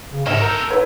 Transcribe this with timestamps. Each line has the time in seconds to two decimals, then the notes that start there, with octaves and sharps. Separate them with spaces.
0.12 C#3
0.26 G#2 A#3 G4 A4 D#5 E5
0.41 A#4 A#5 E6 G6
0.70 E4 A4 B4 C#5